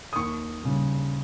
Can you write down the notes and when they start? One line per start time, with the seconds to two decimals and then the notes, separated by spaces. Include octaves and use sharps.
0.13 D#6
0.16 D#2 C#6
0.63 C#3 G3